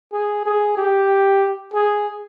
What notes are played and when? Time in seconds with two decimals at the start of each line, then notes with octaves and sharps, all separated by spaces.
0.13 G#4
0.46 G#4
0.77 G4
1.74 G#4